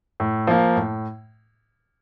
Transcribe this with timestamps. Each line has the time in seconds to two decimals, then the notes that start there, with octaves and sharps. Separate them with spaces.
0.20 A2
0.47 F3 A#3
0.76 A2